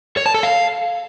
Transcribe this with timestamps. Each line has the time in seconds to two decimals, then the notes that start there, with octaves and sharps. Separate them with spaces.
0.17 C#5
0.26 A5
0.34 A4
0.43 F5